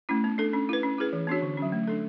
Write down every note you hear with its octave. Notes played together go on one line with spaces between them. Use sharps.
A3 C#4 E4
B3
D4 A4
C#4
E4 B4
C#4
E4 G#4 B4
E3
B3 D4 F#4 C#5
D3
F#3 C#4
A3
D4 A4